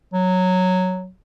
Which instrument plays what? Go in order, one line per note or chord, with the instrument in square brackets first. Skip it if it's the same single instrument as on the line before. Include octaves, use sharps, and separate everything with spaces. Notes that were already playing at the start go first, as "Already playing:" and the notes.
[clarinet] F#3